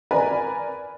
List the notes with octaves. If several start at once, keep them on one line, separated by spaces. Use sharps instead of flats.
A#4 B4 D5 G#5 A#5 B5